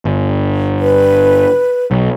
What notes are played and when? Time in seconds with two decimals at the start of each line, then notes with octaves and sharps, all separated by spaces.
0.05 G1
0.80 B4
1.91 B1